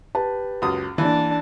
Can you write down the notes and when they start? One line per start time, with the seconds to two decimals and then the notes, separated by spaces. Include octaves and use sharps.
0.15 G4 B4 A5
0.62 C#2 F#2 D#6
0.98 E3 A#3 D4 A5